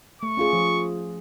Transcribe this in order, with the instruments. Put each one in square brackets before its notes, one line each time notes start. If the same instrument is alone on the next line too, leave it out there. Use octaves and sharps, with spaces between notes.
[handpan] A3 [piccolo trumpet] C#6
[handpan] C#4 F4 G#4
F3